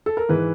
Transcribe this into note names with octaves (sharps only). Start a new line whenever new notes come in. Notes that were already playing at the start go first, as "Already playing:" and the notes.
A4
A#4
G#2 E3 B4